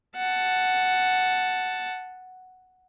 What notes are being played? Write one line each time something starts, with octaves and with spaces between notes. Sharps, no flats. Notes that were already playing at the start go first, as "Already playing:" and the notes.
F#5 A5